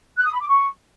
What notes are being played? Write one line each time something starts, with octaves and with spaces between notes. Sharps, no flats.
F#6
D#6
B5
D6
C#6